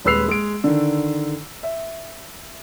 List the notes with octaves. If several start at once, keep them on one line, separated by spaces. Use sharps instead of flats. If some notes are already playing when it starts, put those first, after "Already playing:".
D#1 G#3 B4 E6 C7 F7
G#3 D7
D3 D#3
E5